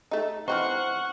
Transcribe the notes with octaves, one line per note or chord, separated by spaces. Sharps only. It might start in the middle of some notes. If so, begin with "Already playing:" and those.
A3 D#4
E3 C4 D#4 C5 F#5 C#6 F6